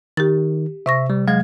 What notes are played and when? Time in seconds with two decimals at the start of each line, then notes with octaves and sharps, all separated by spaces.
0.17 D#3 G4 A6
0.86 C3 E5 C#6 A#6
1.10 G3
1.28 F#3 G#3 F5 G#6